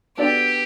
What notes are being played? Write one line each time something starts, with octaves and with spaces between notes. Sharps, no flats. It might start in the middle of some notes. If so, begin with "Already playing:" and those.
B3 D4 F#4 G4 A4 D5